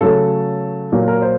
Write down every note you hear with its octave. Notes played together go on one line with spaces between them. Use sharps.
C#3 F#3 A3 A4
A#2 F#3 A#3
A#4
C5